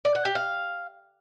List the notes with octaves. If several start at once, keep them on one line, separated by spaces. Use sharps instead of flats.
D5
F#5
G4
F5